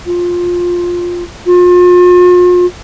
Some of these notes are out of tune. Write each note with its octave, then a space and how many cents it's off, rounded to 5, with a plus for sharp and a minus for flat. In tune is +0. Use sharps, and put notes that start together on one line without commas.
F4 +10
F4 +40